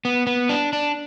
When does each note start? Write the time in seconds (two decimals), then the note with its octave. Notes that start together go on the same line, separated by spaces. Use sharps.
0.05 B3
0.27 B3
0.49 D4
0.73 D4